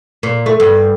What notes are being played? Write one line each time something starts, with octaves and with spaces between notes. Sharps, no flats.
A#2
A3
G2